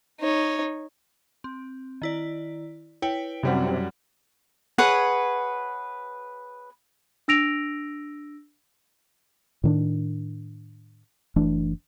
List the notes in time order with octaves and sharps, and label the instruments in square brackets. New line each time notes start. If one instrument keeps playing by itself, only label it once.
[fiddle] D#4 C#5
[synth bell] C4
D#3 E4 D5
[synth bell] E4 B4 C#5 [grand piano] G5
[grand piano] F#2 G3 F#5 [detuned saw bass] C3
[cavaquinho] G#4 B4 C#5 F#5
[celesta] D4 E6 A#6 D7 F7
[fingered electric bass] A2 D#3 D4
F#1 E3 A3 D4